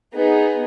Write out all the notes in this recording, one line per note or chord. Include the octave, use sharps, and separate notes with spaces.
B3 D#4 G#4